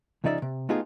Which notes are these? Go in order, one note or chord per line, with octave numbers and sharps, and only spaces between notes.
C#2 C#3 F3 D#4 D5 E5
C3
A3 B3 D#4 F4 G4 G#4